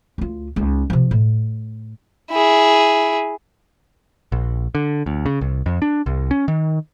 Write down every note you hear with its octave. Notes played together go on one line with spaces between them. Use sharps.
D2 F4
C#2 D#4
C3 F3
A2
E4 G#4
A#1
D3
D2
C#3
C2
F2
D4
C2
C#4
D#3